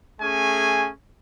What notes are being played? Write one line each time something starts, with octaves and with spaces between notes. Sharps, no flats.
A3 C#4 G#4 G#5